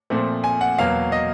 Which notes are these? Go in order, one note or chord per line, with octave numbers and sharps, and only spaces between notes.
A#2 F3 A3 C4
G#5
F#5
E2 B2 F#3 A#3 F5
D#5